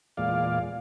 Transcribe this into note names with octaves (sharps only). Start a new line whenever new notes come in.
E2 A#2 G#3 F4 D5 F5